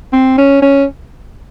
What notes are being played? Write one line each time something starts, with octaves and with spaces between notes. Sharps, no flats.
C4
C#4
C#4